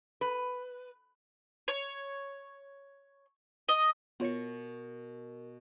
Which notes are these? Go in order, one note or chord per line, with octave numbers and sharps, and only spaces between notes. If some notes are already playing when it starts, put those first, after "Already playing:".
B4
C#5
D#5
B2 B3 F4 A#4 C#5 C#6